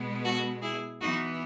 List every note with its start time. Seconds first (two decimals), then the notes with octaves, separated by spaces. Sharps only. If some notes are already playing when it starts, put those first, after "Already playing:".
Already playing: B2 G#3 B3
0.23 F#4 A4
0.62 E4 G#4
1.00 E3 B3 D#4 F#4